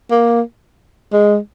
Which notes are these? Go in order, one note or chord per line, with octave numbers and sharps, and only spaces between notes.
A#3
G#3